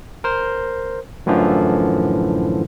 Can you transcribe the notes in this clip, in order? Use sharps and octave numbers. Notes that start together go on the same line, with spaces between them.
A#4 C5
F#2 A2 D3 E3 F3